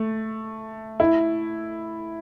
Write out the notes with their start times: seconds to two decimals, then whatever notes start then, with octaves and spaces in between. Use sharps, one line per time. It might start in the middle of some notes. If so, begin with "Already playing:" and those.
Already playing: A3
1.00 E4